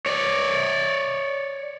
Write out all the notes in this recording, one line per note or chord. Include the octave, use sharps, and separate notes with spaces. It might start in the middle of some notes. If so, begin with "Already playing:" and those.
C#5 D5